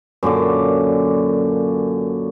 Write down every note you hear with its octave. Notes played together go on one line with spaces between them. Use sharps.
F#2 A#2 D3 D6